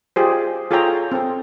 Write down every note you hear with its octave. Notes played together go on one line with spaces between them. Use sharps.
F4 G4 G#4 C5
F4 G#4 A4 C#5 G5 A#5
C4 A4